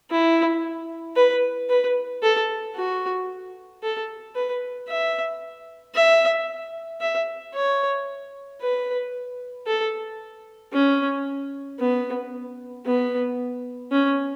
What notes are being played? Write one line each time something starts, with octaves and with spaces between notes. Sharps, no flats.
E4
B4
B4
A4
F#4
A4
B4
E5
E5
E5
C#5
B4
A4
C#4
B3
B3
C#4